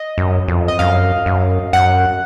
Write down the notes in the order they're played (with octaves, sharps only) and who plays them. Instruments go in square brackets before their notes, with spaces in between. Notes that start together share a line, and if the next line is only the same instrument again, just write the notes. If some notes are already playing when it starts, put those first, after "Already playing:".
Already playing: [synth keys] D#5
[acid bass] F#2
F2
[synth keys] D#5
[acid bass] F#2 [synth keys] F5
[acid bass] F#2
[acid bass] F#2 [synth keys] F#5